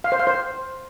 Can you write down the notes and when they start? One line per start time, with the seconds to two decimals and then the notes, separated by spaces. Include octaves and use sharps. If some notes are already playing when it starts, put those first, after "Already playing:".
0.04 F5
0.12 C5
0.20 F5
0.27 C5